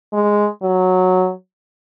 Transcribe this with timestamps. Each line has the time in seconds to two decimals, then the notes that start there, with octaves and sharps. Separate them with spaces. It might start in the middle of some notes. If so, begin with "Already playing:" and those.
0.13 G#3
0.63 F#3